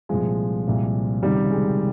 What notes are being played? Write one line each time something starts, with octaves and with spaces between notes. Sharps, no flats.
C2 A#2 F3 G#3
C2 A#2 F3
C#2 C3 D#3 G3
G#3